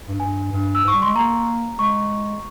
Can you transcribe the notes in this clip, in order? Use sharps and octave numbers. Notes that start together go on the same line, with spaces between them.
G2
G2 G#5
G2
E6
G#2 C#6
G3
G#3 C6
A#3 A#5
G#3 C#6